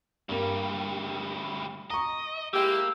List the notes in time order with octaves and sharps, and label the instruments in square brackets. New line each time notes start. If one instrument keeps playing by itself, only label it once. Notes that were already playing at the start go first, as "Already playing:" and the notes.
[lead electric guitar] D2 G3 [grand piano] G2 A#3
[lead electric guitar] D#5 [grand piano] A#5 C#6
[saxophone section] G#3 E4 G4 [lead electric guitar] A#3 [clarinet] E6